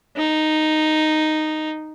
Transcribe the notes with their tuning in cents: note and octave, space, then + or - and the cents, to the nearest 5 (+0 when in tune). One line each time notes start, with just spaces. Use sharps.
D#4 -5